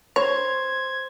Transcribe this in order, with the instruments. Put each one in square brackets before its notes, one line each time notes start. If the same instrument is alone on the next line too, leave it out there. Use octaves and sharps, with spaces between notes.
[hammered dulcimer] C5 [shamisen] C#5 [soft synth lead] G#6